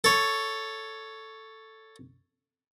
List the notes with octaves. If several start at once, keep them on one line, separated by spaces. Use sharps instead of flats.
A4 C#5